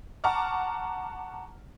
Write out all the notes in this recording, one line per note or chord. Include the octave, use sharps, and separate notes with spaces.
F#5 A5 A#5 C#6 D6 F6